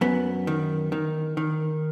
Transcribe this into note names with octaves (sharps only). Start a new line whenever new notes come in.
F#2 B3
D#3
D#3
D#3